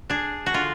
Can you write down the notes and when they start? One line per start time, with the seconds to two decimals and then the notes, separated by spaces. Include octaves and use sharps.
0.10 D4 G#4
0.46 F#4
0.54 D3 F4